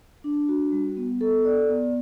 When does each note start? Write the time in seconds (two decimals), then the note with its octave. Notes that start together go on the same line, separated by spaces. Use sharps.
0.24 D4
0.49 F#4
0.72 G3
0.97 B3
1.21 A4
1.45 D5
1.69 B3